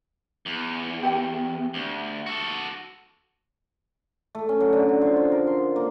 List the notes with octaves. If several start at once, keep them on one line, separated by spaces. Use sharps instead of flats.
E2
G4 E5 G5
D2
F#4 A4
A3
C#4
F#3
D3
F#4
F3
F4
A#4
C6
A#3